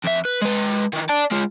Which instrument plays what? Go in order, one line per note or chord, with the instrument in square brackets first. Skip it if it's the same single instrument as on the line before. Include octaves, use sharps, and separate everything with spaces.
[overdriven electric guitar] F2 E5
B4
G#3 B4
D#3 E3
D5 A5
G#3 F4